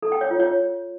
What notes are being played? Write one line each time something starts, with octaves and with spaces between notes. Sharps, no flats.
A4
G5
C#5
F4
C#5